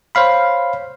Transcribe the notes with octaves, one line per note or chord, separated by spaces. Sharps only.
C5 C#5 F5 B5